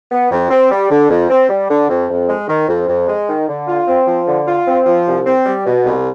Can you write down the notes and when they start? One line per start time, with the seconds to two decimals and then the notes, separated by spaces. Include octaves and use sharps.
0.10 B3
0.31 F2
0.50 C4
0.71 G3
0.90 D3
1.10 F2
1.30 C4
1.49 G3
1.69 D3
1.89 F2
2.09 F2
2.28 G#3
2.48 D#3
2.68 F2
2.88 F2
3.08 G#3
3.27 D#3
3.48 D3
3.67 F4
3.87 C4
4.06 F3
4.26 D3
4.46 F4
4.67 C4
4.86 F3
5.06 C2
5.26 C4
5.45 G3
5.65 B2
5.85 C2